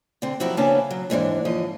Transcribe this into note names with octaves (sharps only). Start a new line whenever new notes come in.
D3 C4
F3 F#3 E4 F#4 G4
C#3 A#3 B3 C#4 D4 A5
F#3
D#2 G#2 E3 D4
D#2 F3 D#5